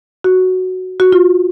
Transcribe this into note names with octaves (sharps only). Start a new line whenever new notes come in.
F#4
F#4
F4